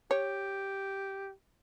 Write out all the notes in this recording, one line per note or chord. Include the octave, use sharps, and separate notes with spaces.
G4 C#5